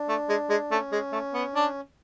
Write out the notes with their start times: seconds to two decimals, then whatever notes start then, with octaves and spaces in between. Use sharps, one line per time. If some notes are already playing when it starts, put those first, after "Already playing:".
Already playing: D4
0.09 A3
0.29 G#3
0.50 G#3
0.71 A3 C#4
0.92 G#3
1.12 A3
1.34 B3
1.55 D4